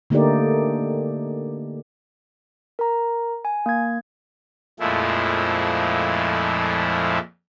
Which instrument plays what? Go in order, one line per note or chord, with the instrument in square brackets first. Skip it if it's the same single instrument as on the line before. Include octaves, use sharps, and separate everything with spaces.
[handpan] D3 A3 A#3 D#4 G4 D5
[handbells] A#4 A#5
G#5
A#3 G#6
[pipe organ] F2 A#2 F3 G#3 A3 E4